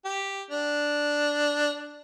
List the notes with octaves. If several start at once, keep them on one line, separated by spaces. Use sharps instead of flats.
G4
D4